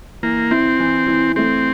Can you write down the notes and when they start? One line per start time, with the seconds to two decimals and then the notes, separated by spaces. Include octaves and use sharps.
0.23 E3 A#3
0.51 C4 E4
0.79 E3
1.08 E3
1.36 A3 C4